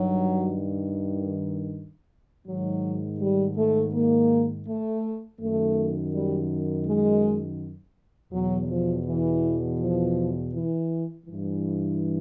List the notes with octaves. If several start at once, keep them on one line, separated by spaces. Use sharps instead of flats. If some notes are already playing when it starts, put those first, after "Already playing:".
Already playing: G2 D#3 F#3
G#2 D#3 F#3
G3
A3
A#3
A3
F#2 D#3 A3
G3
G#3
E2 B2 F#3
F3
E3
F3
E3
G2 E3